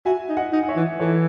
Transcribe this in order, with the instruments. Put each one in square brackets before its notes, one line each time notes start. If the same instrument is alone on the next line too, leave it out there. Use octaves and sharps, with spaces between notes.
[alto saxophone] F#4 [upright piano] E5 G#5
[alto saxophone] D#4
[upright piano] D#5 F#5
[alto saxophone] D#4
[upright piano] F#5
C#5 E5
[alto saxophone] E3
[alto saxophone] E3 [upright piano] A4 C#5